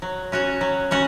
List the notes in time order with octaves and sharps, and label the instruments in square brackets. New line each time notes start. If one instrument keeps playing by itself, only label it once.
[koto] F#3
C#4 F#4 C#5
F#3
C#4 F#4 C#5